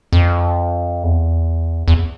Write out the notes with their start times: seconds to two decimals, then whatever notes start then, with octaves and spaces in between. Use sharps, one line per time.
0.13 F2
1.03 E2
1.88 E2